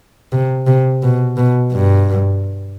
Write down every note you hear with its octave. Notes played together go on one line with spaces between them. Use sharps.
C3
C3
B2
B2
G2